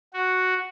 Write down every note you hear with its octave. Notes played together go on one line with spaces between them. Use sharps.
F#4